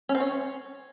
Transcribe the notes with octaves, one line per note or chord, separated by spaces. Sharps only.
C#4
C4
C#5